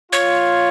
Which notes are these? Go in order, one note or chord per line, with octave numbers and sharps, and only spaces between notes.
F4 C#5